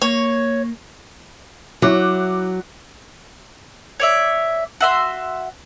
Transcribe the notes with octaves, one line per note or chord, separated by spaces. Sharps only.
A#3 C#5
F#3 E4 D6 F#6
C#5 D5 E5
F#4 E5 C6